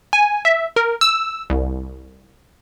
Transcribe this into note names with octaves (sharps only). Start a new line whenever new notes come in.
G#5
E5
A#4
E6
C2